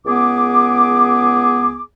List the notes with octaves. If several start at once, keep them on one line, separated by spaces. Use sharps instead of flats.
C#2 B3 G#4 D6